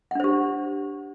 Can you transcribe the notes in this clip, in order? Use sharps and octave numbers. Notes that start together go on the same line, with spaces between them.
D4 G4 C5 F#5